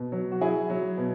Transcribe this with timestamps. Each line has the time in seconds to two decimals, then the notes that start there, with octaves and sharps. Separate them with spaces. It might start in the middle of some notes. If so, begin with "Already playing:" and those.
Already playing: B2
0.12 F#3
0.32 F#4
0.41 F#3 E4 G#4
0.70 F#3
0.98 B2